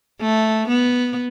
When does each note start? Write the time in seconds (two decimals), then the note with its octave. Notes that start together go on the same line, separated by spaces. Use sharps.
0.21 A3
0.68 B3